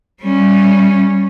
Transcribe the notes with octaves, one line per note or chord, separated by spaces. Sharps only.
G3 C#4